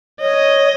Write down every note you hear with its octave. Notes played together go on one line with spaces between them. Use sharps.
C#5 D#5